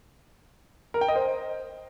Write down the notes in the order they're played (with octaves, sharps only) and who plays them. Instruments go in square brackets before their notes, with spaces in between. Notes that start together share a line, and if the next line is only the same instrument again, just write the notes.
[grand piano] A#4
G5
D#5
C5